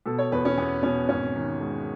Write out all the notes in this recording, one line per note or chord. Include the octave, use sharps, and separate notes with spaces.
B2 A4
C#5
E2 B4
C#4
E2 B3
B2 C#4
G#1 C#4
D#3
G#3